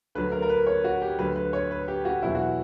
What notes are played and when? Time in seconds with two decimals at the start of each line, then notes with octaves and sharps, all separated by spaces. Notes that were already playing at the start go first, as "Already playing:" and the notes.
0.15 D2 D3 F#3 B4
0.32 A#4
0.42 A#4
0.50 B4
0.67 C#5
0.84 F#4
1.02 G4
1.19 D2 D3 F#3 B4
1.36 B4
1.53 C#5
1.71 B4
1.88 G4
2.05 F#4
2.22 E2 B2 F#3 E4
2.35 F#4